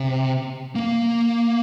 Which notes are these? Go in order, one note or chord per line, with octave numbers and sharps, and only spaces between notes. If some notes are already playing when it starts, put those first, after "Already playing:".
Already playing: C3
A#3